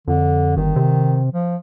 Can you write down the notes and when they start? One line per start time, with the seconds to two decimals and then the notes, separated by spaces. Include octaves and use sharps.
0.08 F2 D3
0.57 G1 D#3
0.76 C3
1.33 F3